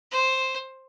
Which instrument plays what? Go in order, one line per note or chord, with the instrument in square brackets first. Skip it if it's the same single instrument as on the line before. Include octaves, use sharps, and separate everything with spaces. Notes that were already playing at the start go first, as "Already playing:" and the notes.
[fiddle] C5